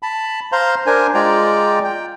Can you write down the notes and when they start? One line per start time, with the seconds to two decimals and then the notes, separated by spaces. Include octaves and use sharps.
0.03 A5 B5
0.52 C5 F5 A#5 C6
0.86 D4 A#4 C5 G#5
1.14 G#3 F4 D5 G5 A#5
1.84 G5